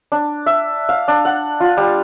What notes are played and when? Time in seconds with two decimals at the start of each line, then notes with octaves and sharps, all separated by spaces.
0.12 D4
0.46 E5
0.89 F5
1.08 D4
1.25 F#5
1.60 F4
1.77 G3